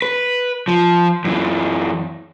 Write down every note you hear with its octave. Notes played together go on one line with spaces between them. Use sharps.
B4
F3
F#2 E3